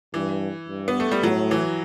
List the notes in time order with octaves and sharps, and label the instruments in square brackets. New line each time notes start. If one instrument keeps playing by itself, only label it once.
[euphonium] G2 [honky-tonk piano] E3
[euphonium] G2
[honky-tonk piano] B3
A3
G3
[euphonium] A2 [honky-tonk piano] F#3
[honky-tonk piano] E3